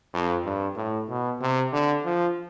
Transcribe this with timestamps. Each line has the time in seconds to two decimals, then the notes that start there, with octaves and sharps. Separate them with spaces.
0.14 F2
0.45 G2
0.77 A2
1.10 B2
1.42 C3
1.73 D3
2.05 F3